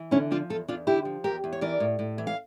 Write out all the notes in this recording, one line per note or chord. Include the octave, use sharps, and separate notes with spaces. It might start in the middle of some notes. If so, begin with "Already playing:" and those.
Already playing: E3
D3 C#4 E4
F3 D4 F4
E2 F4 A4
E2 D4 F4
D3 E4 G4
F3
E2 G4 A#4
E2
C#5
E3 A#4 D5
A2
A2
E3
F5